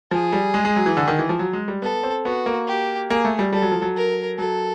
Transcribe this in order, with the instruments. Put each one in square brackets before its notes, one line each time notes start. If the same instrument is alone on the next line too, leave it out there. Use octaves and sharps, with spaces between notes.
[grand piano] F3 [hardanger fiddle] G#4
[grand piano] G3
G#3
G#3
F#3
E3
D3
D#3
E3
F3
F#3
G#3
G3
[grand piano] B3 [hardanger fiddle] A4
[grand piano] C4
[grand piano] B3 [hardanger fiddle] F#4
[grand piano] A#3
[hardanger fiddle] G4
[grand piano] A#3 [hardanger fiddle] G#4
[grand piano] A3
G3
[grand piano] G3 [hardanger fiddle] A4
[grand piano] F#3
F3
F#3
[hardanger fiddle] A#4
[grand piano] F#3 [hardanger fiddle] A4